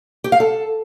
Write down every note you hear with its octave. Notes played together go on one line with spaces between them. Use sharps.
G4
F5
A4